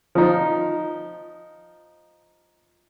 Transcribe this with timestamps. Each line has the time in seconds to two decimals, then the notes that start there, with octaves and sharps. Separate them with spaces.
0.15 F3 D#4